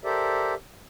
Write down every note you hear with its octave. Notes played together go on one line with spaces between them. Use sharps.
G4 A4 A#4 C5 D5 E5